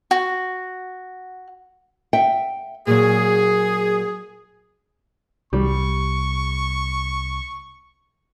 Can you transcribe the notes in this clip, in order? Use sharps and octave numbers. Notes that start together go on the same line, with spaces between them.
F#4
E5 F#5 G5
A#2 F#3 G#4
C2 G3 C#6